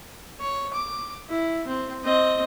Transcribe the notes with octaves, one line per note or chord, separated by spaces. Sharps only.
C#5
D6
E4
C4
C4 D#5